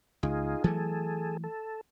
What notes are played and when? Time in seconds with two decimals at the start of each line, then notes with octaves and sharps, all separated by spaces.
0.23 C#2 D#4 F4 G#4
0.64 E3 F#3 A3 G#4 A4
1.44 A4